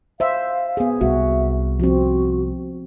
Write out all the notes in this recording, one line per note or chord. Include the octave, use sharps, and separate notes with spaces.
C5 E5 F5
B3 G#4
C2 F#4 E5
F3 C4 F#4